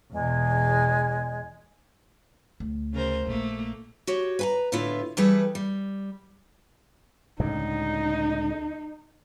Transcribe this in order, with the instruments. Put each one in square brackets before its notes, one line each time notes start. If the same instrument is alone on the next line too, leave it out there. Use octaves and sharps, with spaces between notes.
[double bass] E2 B2 [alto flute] G#3
[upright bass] D2
[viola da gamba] C#3 A#4 C5
[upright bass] A#1 [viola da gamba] A3 A#3
[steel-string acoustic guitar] F#4 G4 C#5
B4 G#5 A#5
A2 D3 B3 E4 F4 E5
E3 G3 A3 E4 G#4 B4
G3
[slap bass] C#2 A2 D3 [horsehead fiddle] D#4